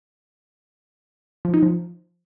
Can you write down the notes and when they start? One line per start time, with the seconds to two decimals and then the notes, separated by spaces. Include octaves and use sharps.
1.45 F3
1.54 D#4
1.63 F3